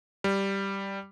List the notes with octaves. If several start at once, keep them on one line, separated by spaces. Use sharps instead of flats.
G3